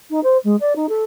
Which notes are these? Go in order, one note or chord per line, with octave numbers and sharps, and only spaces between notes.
D#4
C5
G#3
D5
D#4
A4